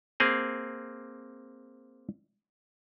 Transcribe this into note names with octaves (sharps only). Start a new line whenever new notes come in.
A#3 C4 G#4